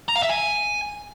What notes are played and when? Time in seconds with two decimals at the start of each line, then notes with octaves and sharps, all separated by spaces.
0.09 A#5
0.16 F5
0.23 E5
0.30 G#5